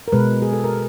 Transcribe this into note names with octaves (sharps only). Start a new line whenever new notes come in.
A#4
B2 G#3 B4
G#4
A4
A#4